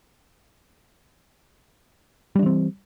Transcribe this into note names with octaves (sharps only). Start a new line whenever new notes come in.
E3 G3 C4 D4